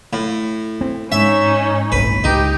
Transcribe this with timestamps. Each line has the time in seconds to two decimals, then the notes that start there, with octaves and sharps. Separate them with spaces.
0.13 A2
0.81 C4
1.12 G#2 C#4 D#4 E5
1.92 G1 C2 A2 B4
2.24 C#2 D#4 G4